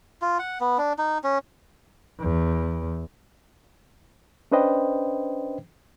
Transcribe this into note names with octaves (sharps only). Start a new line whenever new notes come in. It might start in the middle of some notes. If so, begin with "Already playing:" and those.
F4
F#5
B3
D4
D#4
C#4
E2
C#4 D4 B4 C5 D#5 G5